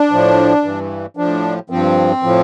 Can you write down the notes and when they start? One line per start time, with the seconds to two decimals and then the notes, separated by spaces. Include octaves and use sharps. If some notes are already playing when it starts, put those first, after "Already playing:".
Already playing: D4
0.11 A2 F3
0.64 G2 E3
1.17 A2 F3 D4
1.70 G2 F3 C4
2.23 A2 F3